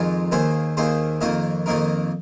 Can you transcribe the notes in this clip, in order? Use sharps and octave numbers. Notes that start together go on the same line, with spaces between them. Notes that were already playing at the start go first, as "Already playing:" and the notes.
Already playing: F2 D#3 G#3 F4 A#4
D#2 D#3 A#3 G#4 C5
D#2 D#3 A#3 G#4 C5
F2 D#3 A#3 D#4 A#4
F2 D#3 A#3 D#4 A#4